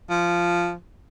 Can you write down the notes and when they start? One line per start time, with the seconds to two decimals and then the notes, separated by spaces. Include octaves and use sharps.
0.10 F3